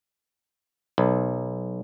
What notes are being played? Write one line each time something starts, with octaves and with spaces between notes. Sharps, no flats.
B1